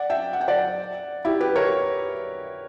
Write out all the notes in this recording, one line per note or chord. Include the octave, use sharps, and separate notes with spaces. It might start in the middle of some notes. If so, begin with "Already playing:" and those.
Already playing: D5 F#5
E5 G5
F#5
G5
D5 F#5
E4 G4
G4 B4
A#4 C#5